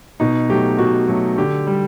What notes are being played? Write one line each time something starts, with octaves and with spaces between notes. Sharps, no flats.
B2 D#4
F#3 A3 G4
B2 F#4
F#3 A3
D3 G4
G3